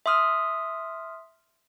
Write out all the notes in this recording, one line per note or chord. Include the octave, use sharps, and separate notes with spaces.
E5 C6 D#6 F6